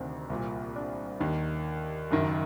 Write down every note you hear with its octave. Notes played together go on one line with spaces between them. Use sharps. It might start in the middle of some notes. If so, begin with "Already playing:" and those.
Already playing: D2 C3 D#3 C4 D4
C2 A#2
D4
D#2 D#3
F#1 F#2 D#3